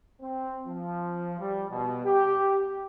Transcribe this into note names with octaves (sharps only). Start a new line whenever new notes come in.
C4
F3
G3
B2
G4